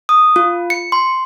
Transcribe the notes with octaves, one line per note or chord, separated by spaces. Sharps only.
D#6
F4
C#7
C6